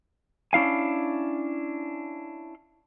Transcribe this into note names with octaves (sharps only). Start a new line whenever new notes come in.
C#4 D4 E4 F5 G#5